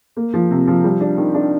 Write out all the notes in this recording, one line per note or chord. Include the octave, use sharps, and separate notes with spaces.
A#3
F3
C3
F3
G3
D4
D#3
D4